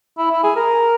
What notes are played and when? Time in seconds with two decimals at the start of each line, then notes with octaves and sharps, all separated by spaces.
0.18 E4
0.31 E4
0.44 G#4
0.56 A#4